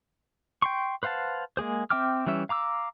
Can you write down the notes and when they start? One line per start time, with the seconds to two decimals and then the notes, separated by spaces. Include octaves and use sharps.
0.62 G5 C6 C#6
1.03 B4 C5 F5 F#5 A5
1.57 G#3 A#3 G#4 C5
1.90 C4 E5 G5 D6 F6
2.26 E3 G3 C#4 E5
2.49 F5 A#5 D6 E6